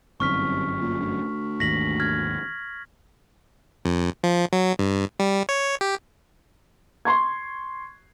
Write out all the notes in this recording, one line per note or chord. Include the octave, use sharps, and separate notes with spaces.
G1 C2 F#2 C#6 F6 B6
A#2
D2
G#1 D#2 A#6 B6 F#7
F6 G#6
F2
F3
F#3
G2
G3
C#5
G4
C6 C#6 G#6